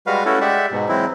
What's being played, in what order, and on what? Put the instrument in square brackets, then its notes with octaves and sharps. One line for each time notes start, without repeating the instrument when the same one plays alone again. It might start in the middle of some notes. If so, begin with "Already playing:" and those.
[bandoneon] G3 G#3 F#4 B4 F5
A3 C#4 E4 F#4 A4
G#3 G4 D5 E5 F#5
G#2 B2
E3 F#3 G#3 C4 E4